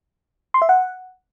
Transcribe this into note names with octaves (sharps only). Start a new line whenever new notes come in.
C6
E5
F#5